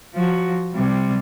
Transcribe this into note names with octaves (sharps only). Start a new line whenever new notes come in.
F3 F#4
C3 G3